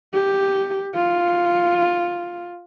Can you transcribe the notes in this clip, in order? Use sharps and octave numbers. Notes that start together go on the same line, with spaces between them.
G4
F4